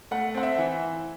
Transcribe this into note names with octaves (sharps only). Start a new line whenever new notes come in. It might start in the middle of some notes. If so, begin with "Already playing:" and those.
A3 F#5
C4 F#5
E5
E3